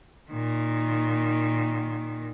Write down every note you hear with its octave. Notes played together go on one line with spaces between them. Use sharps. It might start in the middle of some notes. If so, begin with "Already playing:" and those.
A#2 D#3